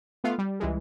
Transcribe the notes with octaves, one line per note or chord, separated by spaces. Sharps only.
A3 B3 F4 F5
G3
C#2 E3 G3 G#3